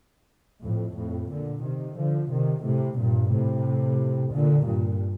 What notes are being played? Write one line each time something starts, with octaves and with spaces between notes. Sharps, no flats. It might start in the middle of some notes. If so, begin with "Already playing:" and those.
F2 A2
F2 A2
A#2 D3
C3 D#3
D3 F3
C3 D#3
A2 C3
G2 A#2
A2 C3
A#2 D3
G2 A#2